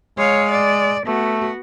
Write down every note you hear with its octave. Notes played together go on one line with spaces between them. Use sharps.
G#3 C#5 F5
D5
A3 B3 F#4